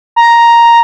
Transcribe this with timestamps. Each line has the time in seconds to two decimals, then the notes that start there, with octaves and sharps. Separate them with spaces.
0.16 A#5